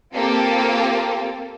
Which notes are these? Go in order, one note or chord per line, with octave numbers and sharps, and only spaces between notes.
A#3 C4 F4 G4 A4